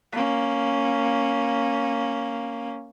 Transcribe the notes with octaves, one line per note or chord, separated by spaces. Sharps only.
A#3 C#4